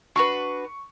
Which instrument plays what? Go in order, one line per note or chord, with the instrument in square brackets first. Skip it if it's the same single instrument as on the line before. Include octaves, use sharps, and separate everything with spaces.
[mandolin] D4 F#4 B4 [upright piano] C#6